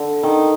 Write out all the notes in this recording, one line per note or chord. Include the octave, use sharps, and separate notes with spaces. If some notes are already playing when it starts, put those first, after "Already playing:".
Already playing: D3
D#3